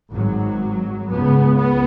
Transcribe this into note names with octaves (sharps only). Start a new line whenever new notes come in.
G#1 G#2 F#3
C#2 C#3 B3
B3